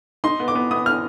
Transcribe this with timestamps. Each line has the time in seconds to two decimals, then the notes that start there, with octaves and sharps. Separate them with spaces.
0.24 D#4 C6
0.40 B3
0.48 D6
0.55 B3
0.71 B3 D#6
0.86 F6